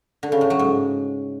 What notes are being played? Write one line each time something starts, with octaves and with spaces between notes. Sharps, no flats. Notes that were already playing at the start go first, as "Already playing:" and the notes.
D3
C#3
A2
F#3
G#2